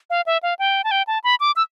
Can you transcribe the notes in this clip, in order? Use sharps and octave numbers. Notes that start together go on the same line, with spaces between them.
F5
E5
F5
G5
A5
G5
A5
B5
D6
E6